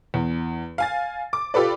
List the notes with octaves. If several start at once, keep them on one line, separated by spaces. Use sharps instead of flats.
E2
F5 G#5 A6
D6
F4 G4 A4 B4 D5